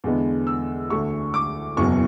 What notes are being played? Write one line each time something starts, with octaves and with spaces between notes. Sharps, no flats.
E2 D3 G#3 B3
E6
D2 D3 A3 C#6
D6
F#1 E2 B2 F#3 C#6